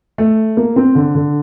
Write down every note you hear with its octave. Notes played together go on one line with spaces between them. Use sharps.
A3
A#3
C4
D3
D3